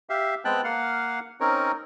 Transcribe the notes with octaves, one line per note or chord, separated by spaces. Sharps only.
G4 E5 F5
G#3 B3 C4 G5 A5 F#6
A#3 F5 F#5 F6
C4 C#4 D#4 A#4 C#5